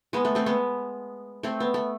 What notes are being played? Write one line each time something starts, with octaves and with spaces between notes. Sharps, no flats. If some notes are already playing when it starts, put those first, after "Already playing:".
G#3 B3
A3
A3 C4
G#3 B3
A3 C4
B3
A3